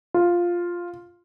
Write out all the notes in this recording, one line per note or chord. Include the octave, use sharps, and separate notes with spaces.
F4